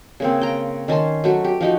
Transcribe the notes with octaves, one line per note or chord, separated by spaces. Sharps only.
C#3 A#3 C4
G5 A#5
D#3 C#4 A5 C6
F#3 A3 F#4
G4
F3 D#4 F#4